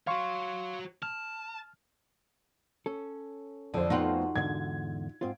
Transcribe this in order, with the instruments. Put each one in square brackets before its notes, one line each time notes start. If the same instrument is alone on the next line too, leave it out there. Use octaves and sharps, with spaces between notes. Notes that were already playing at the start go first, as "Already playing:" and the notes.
[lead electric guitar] F#4 C#5 [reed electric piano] F5 C6 C#6
[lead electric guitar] A5 [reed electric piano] F6
[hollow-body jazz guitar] C#4 A4
[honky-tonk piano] F2 C5 [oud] D3
[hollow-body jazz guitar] A3 B3 G5 [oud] D#4 F4 F#4
[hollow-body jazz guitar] E2 G#2 D3 [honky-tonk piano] G#6
[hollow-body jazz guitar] G#2 C4 F4